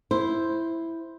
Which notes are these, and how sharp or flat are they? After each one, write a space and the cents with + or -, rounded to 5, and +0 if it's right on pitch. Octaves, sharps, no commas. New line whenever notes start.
E4 +0 C5 +0